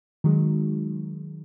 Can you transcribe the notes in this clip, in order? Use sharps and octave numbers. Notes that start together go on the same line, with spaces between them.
D#3 F#3 G#3